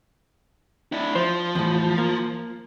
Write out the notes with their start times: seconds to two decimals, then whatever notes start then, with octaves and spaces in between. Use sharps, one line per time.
0.92 D4 E4
1.15 F3 C5
1.55 E2 A2
1.98 A#3